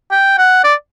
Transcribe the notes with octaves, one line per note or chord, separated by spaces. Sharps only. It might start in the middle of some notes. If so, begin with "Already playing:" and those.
G5
F#5
D5